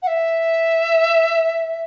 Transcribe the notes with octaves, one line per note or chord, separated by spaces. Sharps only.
F#5
E5